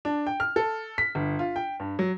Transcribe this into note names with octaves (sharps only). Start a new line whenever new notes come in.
D4
G5
F6
A4
B6
G1
F4
G5
G2
F#3